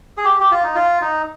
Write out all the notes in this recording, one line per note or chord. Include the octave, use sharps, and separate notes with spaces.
G#4
G4
G4
F4
D#4
F4
D#4